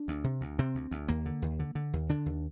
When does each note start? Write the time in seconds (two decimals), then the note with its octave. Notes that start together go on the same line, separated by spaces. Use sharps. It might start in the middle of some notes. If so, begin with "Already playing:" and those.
Already playing: D4
0.08 D2
0.24 C3
0.41 D2
0.59 C3 C4
0.75 D2
0.91 D2
1.08 D#2 A#3
1.26 D3
1.42 D#2
1.59 D3
1.75 D3
1.93 D#2
2.09 D3 D4
2.26 D#2